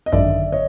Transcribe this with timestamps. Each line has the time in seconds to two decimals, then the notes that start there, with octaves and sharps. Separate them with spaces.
0.06 D#5
0.12 G#1 F#2 D3 D5 E5
0.52 C#5 D#5